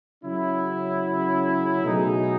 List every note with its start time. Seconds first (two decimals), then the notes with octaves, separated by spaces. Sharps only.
0.24 C#3 F#3 C#4 E4
1.84 B2 F#3 A3 D#4 G#4